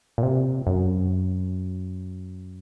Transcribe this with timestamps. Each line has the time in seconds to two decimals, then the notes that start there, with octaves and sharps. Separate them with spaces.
0.18 A#2
0.23 C3
0.67 F#2